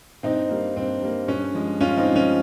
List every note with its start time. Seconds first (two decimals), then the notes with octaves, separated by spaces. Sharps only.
0.23 G2 C4 D#4
0.49 G3 A#3
0.76 G2 C4
1.02 G3 A#3
1.28 G2 C#4
1.54 F3 G#3
1.81 G2 C#4 F4
1.97 C4 D#4
2.07 F3 G#3
2.16 C#4